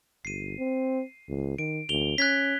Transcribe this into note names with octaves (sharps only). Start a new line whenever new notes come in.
G1 C7 D#7
C4
C#2
D#3 D7
D2 F7 G7
C#4 F#6 G#6 B6